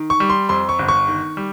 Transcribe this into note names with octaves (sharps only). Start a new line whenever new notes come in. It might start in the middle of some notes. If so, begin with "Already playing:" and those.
Already playing: D#3
C#6
G3
C6
F2 C6
C#6
G1
C#6
D#3
G3